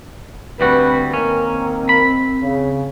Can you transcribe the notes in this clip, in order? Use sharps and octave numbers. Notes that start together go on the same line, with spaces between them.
D2 G3 C4 F#4 B4
D#3 A#3 C#4 A#4
B5
C#3